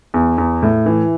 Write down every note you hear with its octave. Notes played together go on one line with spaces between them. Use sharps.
E2
E2
A2
E3